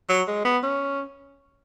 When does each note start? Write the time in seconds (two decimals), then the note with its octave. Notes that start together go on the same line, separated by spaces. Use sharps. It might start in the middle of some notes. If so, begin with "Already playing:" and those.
0.09 F#3
0.28 G#3
0.45 B3
0.63 C#4